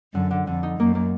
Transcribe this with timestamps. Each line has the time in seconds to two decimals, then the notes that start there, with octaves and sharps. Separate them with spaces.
0.14 F#2 D3
0.31 D3
0.47 F2 D3
0.63 D#4
0.79 F#2 A#3
0.95 A#3